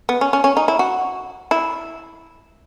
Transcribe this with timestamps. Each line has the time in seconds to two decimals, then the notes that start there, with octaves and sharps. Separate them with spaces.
0.09 B3
0.21 C#4
0.33 C#4
0.44 C#4
0.57 D#4
0.68 E4
0.79 F#4
1.51 E4